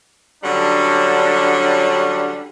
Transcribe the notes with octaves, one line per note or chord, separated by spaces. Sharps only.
D3 F#3 G3 C#4 D4